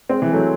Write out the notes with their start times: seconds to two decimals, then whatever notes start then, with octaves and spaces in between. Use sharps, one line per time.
0.09 G#3 C4
0.21 E3 G#3
0.33 F#3 A3